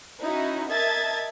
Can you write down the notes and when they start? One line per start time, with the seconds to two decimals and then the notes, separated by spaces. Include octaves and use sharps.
0.21 C#4 D#4 E4 F#4
0.71 A#4 D#5 E5 A5 G#6 A6